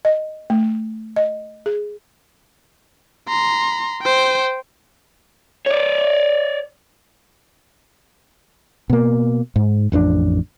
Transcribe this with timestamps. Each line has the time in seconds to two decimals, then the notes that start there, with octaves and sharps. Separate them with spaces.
0.05 D#5
0.50 A3
1.16 D#5
1.66 G#4
3.28 A#5 C6
4.03 C5 G5
5.67 C#5 D5
8.90 B2 A#3
9.56 G#2
9.92 A1 F2 B3 D4